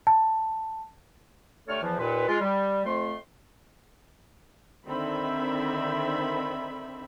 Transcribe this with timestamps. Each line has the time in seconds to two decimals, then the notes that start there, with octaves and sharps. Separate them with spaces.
0.07 A5
1.67 D3 G3 A3 A4 C#5 F6
1.82 E2 E3 F3
1.99 D#2 A#2 B4
2.28 G#3 F4
2.40 G3
2.85 F2 A3 C6
4.88 D3 D#3 C4 E5 B5